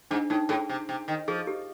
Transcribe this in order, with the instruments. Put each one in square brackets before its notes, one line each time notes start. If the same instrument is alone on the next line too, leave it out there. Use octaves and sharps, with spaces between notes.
[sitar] G#2 [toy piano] D4
[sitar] A2 [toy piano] D#4
[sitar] A2 [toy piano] G#4
[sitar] C3
C3
D#3
[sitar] F3 [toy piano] G#4
[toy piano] G4